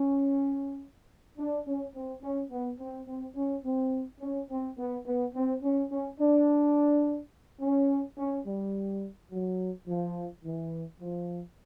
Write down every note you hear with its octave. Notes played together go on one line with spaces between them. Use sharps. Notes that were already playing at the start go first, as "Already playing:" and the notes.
Already playing: C#4
D4
C#4
C4
C#4
B3
C4
C4
C#4
C4
C#4
C4
B3
B3
C4
C#4
C#4
D4
C#4
C#4
G3
F#3
F3
E3
F3